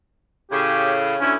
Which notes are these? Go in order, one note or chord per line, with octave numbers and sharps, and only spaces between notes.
A2 C#3 G4
D2 C#4 E4